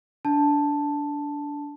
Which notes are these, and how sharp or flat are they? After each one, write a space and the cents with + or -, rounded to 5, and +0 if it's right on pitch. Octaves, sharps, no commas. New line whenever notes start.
D4 -20 A5 +0